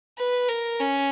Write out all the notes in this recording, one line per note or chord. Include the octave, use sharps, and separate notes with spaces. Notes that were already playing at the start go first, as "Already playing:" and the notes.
B4
A#4
C#4